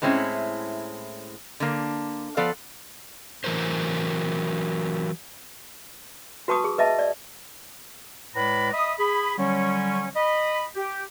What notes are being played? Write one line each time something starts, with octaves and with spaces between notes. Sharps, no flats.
A2 G#3 C4 C#4 E4
D3 A#3
F3 B3 A4 D5 F5
E3 F#3 A#4 C5
F#4 B4 A5 C#6 D#6
G#4
B4 D#5 E5 A5
D5
A2 G#3 B4 D5 A#5 B5
D#5 E5 B5 D#6
G#4 B5
D3 F#3 G3 C#4
D#5 B5
G4